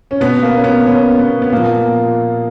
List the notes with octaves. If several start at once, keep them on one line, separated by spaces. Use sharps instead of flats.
C#4
B2 B3
A#3
C#4
B3
B2 C#4
B3
B3
A#2 F3 A#3